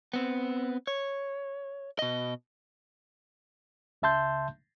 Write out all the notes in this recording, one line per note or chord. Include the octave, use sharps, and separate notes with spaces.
B3 C4
C#5
B2 D#5
C#2 C#3 E5 A5 C6 G6